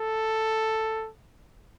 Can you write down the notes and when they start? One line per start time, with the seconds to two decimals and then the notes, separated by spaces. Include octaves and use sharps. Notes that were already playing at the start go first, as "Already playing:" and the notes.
Already playing: A4